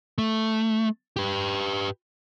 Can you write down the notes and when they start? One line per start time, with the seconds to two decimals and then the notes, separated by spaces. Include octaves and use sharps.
0.18 A3
1.16 G4 B4